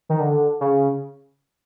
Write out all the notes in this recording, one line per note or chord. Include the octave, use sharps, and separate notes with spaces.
D#3
D3
C#3